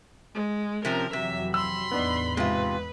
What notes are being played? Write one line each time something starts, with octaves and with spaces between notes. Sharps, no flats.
G#3
C3 F3 C4 C#4 A#4
F2 C3 E3 F#3 E5
B5 C6 E6
E2 A2 B3 D4 D#4
G#2 C3 F4 B4